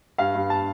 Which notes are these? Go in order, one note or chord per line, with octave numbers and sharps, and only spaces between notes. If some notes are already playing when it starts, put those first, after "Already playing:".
G2 F5
G2
A5